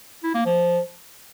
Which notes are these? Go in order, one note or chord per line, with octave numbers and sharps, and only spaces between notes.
E4
A#3
F3